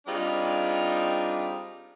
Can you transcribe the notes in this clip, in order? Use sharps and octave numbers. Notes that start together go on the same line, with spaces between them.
G3 C4 D4 D#4 F4 G#4